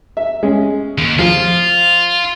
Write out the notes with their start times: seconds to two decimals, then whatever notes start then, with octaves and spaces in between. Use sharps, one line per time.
0.17 E5
0.43 G#3 C#4
0.98 D#2
1.19 F3 F4